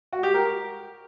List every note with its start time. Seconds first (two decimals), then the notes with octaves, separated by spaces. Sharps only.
0.13 F#4
0.23 G4
0.34 A#4